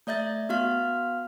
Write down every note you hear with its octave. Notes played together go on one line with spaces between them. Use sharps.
A3 D5 E5 G6 A6
B3 F#4 F5 F6